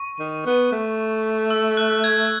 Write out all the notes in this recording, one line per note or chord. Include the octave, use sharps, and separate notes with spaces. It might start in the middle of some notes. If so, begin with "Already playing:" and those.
Already playing: C#6
D#3
B3
A3
E6
F#6
G#6